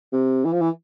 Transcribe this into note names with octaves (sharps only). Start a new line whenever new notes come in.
C3
E3
F3
E3